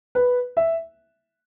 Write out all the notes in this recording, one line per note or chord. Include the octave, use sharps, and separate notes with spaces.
B4
E5